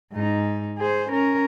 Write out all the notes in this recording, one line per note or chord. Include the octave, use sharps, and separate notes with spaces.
G#2 D#4
G#4 C5
C#4 A#4